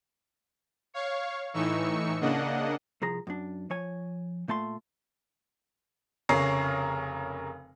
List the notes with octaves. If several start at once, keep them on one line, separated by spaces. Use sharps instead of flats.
C#5 F5 C#6
A2 E3 D#4 C#6 E6 C#7
C#3 A#3 D4 D#5 F#5
C2 F3 G#4 A#5
F#2 D4
F3 C#5 G#5
A#2 A3 A5 C6
F1 C#3 A#4 C#5 C7